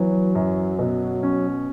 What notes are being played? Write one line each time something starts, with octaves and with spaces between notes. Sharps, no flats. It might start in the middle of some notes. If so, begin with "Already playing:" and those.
Already playing: E3 F#3 B3
F#2
B2
C#4